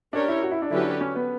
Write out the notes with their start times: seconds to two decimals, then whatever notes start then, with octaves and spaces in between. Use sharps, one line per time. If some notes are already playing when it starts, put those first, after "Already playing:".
0.13 C#4 D4 G4 A#4 C#5
0.28 E4
0.43 F#4
0.51 E4
0.62 D4
0.71 D3 F#3 C#4 E4 G4 B4
0.81 D4
1.01 C#4
1.16 B3